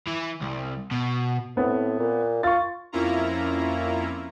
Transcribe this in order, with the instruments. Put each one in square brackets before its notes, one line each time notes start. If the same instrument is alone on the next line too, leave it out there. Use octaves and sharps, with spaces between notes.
[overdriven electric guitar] E3
C2
B2
[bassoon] A2 [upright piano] B3 C4
[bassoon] A#2
[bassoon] F4 [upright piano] C#6 A6
[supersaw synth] F2 A#3 C#4 E4 F4 A#5